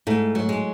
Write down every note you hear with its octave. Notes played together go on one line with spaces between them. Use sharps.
G#2 A3
F#3
G#3